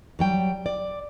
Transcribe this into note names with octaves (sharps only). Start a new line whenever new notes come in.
F#3 G3 G5
D5